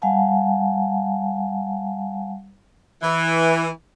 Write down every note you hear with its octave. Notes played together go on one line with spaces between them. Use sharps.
G3 F5 F#5 G#5 A5
E3